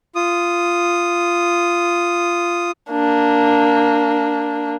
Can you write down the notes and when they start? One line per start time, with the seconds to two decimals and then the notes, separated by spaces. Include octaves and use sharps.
0.15 F4 D#6
2.90 A#3 D4